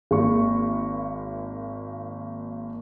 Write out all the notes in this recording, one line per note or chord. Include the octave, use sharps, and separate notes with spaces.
G#1 A#3 C#6